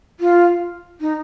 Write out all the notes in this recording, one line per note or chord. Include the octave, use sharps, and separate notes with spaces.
F4
D#4